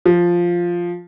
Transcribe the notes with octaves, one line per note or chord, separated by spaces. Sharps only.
F3